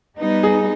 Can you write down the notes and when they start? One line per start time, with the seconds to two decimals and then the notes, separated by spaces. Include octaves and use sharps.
0.19 G3 B3 D#4
0.43 G#4